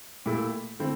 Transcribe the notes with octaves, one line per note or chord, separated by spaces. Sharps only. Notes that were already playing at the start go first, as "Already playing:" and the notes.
A#2 A3 E4 G4
D3 A3 C4 E4